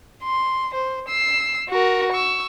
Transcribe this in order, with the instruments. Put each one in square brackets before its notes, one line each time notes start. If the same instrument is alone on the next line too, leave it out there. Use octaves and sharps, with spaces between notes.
[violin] C6
C5
E6 C7
F#4 A#4
C#6 E6